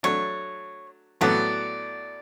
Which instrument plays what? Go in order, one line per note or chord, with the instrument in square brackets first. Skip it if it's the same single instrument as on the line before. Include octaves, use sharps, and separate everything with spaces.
[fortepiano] F#3 A3 D4 [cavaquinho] C#5
[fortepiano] A2 F#3 B3 F#4 A4 [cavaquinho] D5